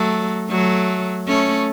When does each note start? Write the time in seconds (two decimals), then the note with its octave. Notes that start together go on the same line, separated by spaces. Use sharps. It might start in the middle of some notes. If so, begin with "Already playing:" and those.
Already playing: F#3 A3
0.50 F#3 A3
1.28 A3 C#4